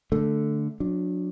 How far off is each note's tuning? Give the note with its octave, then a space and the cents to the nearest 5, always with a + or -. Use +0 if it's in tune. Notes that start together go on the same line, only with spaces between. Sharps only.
D3 +0 A3 +0
F#3 -30 D4 +0